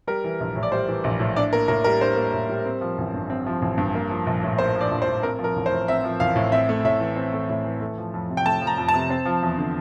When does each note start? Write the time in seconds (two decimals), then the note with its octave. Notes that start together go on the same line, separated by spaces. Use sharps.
0.07 G3 A#4
0.24 E3
0.40 A#1
0.56 A2
0.63 D5
0.72 G3 C5
0.88 E3
1.04 A#1
1.20 A2
1.36 D4 D5
1.53 A#3 A#4
1.68 A2 A#4
1.84 G3 A#4
2.01 D4 C5
2.16 A#3
2.34 A2
2.49 G3
2.65 C4
2.81 F3
2.98 A1
3.14 G2
3.30 C4
3.47 F3
3.62 A1
3.78 G2
3.95 A#3
4.10 F3
4.27 A#1
4.43 A2
4.58 A#3 C5
4.75 F3
4.81 D5
4.91 A#1
5.02 C5
5.07 A2
5.23 C4 A#4
5.39 F3
5.44 A#4
5.56 A1
5.66 C5
5.71 A2
5.88 C4 E5
6.04 F3
6.20 A1 F5
6.36 A2
6.52 C4 E5
6.69 A3
6.84 A2 E5
7.00 E3
7.16 C4
7.33 A3
7.49 A2
7.64 E3
7.81 A3
7.98 F3
8.14 F2
8.29 C3
8.37 G5
8.45 A3 A5
8.62 F3
8.67 A#5
8.78 F2
8.89 A5
8.94 C3
9.10 C4
9.26 F3
9.43 E2
9.58 D3